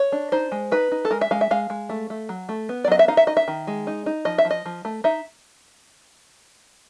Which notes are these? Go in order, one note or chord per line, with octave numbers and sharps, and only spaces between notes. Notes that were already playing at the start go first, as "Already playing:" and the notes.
Already playing: C#5
D4
D#4 C5
G#3
D#4 B4
D#4
A4
G#3 A#4
E5
G#3 F5
E5
G#3 F5
G#3
A3
A3
F#3
A3
B3
D5
F#3 D#5
E5
D#4 F5
E5
D#4 D#5
E5
D#3
G#3
D#4
D#4
F3 D#5
E5
F3
D#5
F3
A3
D#4 E5